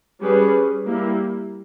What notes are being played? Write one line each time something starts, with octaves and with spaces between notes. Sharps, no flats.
G3 C#4 G#4 B4
G3 A#3 E4